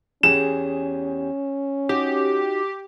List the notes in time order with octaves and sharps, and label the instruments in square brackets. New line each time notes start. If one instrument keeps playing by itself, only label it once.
[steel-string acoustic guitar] E2 G4 G#4 [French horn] C#4 [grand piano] E7
[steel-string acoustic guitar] D#4 F#4 [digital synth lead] G4